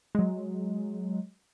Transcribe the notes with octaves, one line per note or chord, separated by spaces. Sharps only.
F#3 G#3